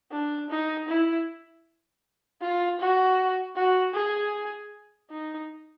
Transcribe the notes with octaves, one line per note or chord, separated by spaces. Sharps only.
D4
D#4
E4
F4
F#4
F#4
G#4
D#4